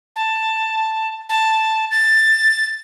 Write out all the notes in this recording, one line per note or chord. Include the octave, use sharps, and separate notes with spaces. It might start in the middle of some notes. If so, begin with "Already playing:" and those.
A5
A5
A6